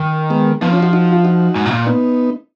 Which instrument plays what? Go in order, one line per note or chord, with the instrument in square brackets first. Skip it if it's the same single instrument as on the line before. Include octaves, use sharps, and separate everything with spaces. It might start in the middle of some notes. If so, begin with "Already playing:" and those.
Already playing: [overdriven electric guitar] D#3
[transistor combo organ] G#3 B3
[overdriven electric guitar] F3 [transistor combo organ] B3 D#4
[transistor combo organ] C#4 F4
D#4 F#4
D#4 F#4
F4
D#4 F#4
[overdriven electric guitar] G#2
B2
A#2
[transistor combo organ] B3 D#4